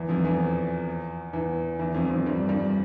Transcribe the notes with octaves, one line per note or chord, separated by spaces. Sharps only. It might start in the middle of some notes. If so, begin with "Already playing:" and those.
Already playing: E2 E3
F2 F3
E2 E3
E2 E3
E2 E3
F2 F3
F2 F3
G2 G3
G2 G3